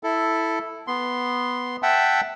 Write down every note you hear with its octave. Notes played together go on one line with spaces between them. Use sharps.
E4 A4
B3 C6
E5 F#5 G5 A5